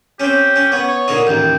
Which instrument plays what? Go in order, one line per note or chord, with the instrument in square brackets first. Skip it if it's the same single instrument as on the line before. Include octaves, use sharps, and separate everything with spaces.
[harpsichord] C4 C#4 [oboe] G4
[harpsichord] C#4
[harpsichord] B3 [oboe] C#5
[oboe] C#5
[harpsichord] A#2 D3 D#4
[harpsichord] A1 D#2 [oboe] G5